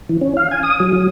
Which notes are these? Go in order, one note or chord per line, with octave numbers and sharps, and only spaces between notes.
E3
C#4
F5
G#5
D#6
F#3
F#3